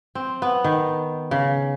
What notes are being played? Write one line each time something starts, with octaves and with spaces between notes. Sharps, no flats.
C4
B3
D#3
C#3